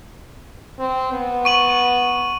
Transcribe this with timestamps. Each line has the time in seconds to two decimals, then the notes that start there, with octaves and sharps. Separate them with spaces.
0.79 C4
1.12 B3
1.45 C#6 D#7 F#7